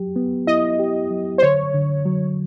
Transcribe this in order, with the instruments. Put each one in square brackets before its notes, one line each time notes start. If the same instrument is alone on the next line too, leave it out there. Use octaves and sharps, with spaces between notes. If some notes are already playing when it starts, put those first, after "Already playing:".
Already playing: [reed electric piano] F#3 G4
B3
[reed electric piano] E4 [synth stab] D#5
[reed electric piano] G4
F#3
[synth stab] C5
[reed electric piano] D3 [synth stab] C#5
[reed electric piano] D3
F#3